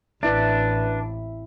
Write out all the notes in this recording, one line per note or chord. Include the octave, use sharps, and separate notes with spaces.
A1 C4 D4 E4 B4 E5